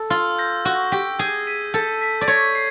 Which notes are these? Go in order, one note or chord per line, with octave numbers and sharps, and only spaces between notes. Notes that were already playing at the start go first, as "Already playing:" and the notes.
Already playing: A4
F4 E6
G6 A#6
F#4 E6
G4 G6 A#6
G#4 G6
B6 D#7
A4 G6
B6 D#7
D5
C#5 G#6
C7